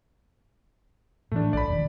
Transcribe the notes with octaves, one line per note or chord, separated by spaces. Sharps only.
A2 E3 A3 D4
A#1 D5 B5
E1 D#3